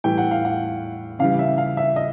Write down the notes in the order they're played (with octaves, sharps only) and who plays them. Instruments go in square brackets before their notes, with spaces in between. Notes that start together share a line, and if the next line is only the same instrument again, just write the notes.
[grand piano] A2 E3 G3 G5
F#5
F5
F#5
C#3 E3 G3 F5
E5
F5
E5
D#5